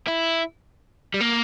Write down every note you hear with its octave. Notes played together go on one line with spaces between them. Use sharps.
E4
G3
A#3